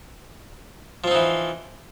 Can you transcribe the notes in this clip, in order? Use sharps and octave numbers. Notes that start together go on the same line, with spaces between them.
E3 F3 C4 D#4